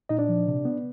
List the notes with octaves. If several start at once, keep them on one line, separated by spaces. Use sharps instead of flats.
A#2 D#4 D#5
D4 D5
F3
C3
B3